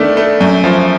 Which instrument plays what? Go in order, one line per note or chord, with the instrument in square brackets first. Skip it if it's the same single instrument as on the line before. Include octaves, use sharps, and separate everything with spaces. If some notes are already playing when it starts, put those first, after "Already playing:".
Already playing: [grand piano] D#3 A3 D4
A3
F#2
F3